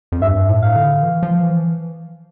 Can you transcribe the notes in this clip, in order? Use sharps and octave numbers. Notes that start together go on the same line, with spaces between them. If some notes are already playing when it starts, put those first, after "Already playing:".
F2
G2 E5
A2
F5
D3
E3
F3
E3